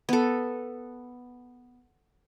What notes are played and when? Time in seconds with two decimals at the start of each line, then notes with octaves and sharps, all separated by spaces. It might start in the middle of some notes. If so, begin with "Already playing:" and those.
0.09 B3 A4